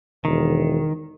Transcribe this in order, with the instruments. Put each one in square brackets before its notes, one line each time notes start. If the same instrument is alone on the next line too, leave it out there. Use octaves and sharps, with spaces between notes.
[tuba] E1 [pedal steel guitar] D#3